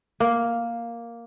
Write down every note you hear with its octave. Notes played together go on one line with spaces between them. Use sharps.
A#3